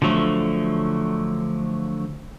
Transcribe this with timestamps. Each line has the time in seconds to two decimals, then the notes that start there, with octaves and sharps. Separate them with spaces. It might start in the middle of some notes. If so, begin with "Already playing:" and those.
0.02 D3 F3 F#3 A3